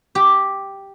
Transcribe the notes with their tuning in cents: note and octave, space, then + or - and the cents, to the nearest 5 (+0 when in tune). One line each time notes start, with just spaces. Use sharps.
G4 +0